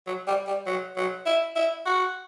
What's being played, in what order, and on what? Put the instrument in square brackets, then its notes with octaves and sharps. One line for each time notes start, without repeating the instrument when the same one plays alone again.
[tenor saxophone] F#3
G3
G3
F#3
F#3
E4
E4
F#4